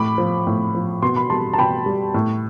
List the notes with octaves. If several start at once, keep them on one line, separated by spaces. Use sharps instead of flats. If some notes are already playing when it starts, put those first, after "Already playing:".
Already playing: A2 B5 D6
F3
A2
F3
B2 C6
B5
G3 A5 C6
A5
B2 G5 B5
G3
A2